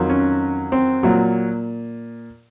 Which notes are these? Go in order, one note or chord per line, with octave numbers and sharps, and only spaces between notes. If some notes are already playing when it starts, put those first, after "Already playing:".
Already playing: F2 D#3 F#3
C#4
C4
A#2 F#3